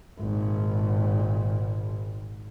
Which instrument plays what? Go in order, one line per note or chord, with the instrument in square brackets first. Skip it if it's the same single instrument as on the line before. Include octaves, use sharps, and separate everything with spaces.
[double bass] G#1 A#2